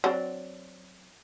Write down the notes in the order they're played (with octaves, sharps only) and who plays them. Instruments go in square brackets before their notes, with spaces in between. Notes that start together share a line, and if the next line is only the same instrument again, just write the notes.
[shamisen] F#3 C4 D4